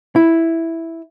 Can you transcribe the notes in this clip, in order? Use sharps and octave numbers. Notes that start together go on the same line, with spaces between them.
E4